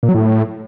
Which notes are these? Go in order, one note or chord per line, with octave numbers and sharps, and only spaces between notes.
A#2
F#3
A2